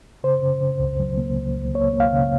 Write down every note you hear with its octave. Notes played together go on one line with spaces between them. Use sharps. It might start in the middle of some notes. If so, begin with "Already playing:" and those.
C#3 C5
C#3
C#3
C#2
F#3
A#3
C#2
C#2
A#3 C#5
A#3
F5
C#3